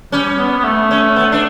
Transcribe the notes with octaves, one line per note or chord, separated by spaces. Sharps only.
G3 C#4
B3
B3
A3
C#4
B3
D4